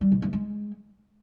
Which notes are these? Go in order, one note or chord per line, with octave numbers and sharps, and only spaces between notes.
G3
B2
G2
G#3